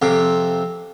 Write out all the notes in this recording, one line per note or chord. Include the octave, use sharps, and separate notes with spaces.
F2 C3